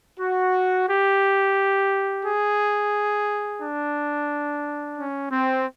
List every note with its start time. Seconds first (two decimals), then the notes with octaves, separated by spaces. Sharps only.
0.20 F#4
0.88 G4
2.25 G#4
3.61 D4
4.97 C#4
5.31 C4